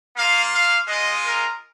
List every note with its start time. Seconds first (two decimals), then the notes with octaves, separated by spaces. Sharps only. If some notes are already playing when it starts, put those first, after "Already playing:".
0.16 A#3 F4 F5
0.53 F5
0.88 G#3 F4 D#5
1.24 A#4